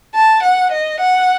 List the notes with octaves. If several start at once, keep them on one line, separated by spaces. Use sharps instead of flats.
A5
F#5
D#5
F#5